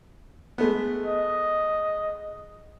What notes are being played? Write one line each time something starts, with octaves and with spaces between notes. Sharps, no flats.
G#3 A3 B3
D#5